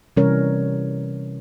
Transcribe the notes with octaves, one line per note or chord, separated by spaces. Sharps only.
C3 E3 G3 C#4 A#4 C#5